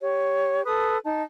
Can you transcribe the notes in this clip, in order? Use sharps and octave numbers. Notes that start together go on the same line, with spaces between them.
G4 C#5
A4 B4 D#6
D#4 A5